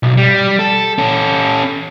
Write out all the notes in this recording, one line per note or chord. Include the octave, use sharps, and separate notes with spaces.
B1
G3
A4
C#4 A4